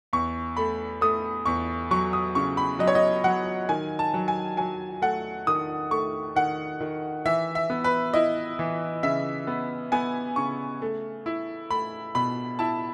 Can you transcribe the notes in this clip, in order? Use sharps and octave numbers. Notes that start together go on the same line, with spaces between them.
E2 C#6
A3 B5
A3 D#6
E2 C#6
F#3 C#6
D#6
C#3 C#6
B5
F#3 D#5
C#5
D#5
F#3 F#5
D#3 G#5
A5
F#3
G#5
F#3 G#5
A3 F#5
D#3 D#6
A3 C#6
D#3 F#5
D#3
E3 E5
E5
B3
B4
E4 D#5
E3
C#3 E5
B3
B3 G#5
C#3 C#6
A3
E4
A3 B5
B2 B5
E4 A5